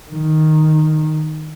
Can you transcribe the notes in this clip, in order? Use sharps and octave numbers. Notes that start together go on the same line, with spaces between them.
D#3